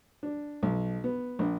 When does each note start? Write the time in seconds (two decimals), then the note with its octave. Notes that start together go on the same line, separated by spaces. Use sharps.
0.23 D4
0.63 B1
1.04 B3
1.39 A#1